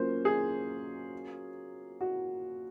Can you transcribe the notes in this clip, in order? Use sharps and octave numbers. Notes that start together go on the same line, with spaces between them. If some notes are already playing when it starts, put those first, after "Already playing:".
Already playing: F#3 A#3 C#4 F4 A#4 C5
G#4
F#4